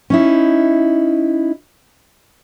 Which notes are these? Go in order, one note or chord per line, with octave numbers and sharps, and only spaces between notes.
C#4 D#4 E4